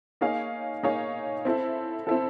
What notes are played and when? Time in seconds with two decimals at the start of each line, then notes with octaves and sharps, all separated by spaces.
0.21 A#3 D#4 G#4 C#5 F5
0.83 A#3 D#4 G#4 C#5 F5
1.45 C4 E4 A4
2.07 C4 E4 A4